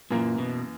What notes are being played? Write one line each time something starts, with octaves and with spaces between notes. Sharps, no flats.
F#2 A#2 E3 A#3
B2